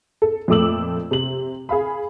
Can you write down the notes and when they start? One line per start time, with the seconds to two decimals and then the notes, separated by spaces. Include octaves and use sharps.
0.22 A4
0.48 F2 A#2 A3 D6 E6 F#7
1.11 C3 F#7
1.69 G#4 F5 B5